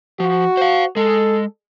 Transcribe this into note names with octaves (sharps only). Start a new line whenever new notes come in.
F3 F#4
C5 F5
G#3 A4